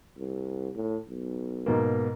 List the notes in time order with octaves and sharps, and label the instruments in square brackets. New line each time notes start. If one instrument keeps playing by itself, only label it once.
[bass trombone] C2
A2
B1
[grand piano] G#2 B2 A#3